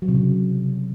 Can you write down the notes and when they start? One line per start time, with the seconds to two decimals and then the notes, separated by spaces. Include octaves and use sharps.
0.02 F#3
0.08 C3
0.15 C#3